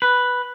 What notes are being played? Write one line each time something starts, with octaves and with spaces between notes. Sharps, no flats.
B4